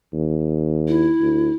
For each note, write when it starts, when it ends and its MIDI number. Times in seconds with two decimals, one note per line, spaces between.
0.13 1.11 39
0.88 1.54 64
1.21 1.50 38